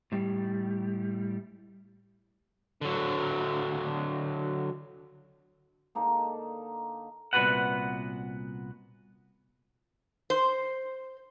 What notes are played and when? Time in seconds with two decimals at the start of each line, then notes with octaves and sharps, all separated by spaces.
0.12 A2 G3
2.81 D3 F#3
5.95 D3 A#3 D#4 A4
7.33 C2 A#2 B3 F#4 B4 F#5
10.30 C5